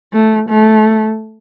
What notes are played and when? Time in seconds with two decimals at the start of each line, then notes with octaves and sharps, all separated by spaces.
0.13 A3
0.49 A3